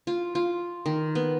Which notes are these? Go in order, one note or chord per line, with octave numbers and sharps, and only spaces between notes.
F4
F4
D#3
B3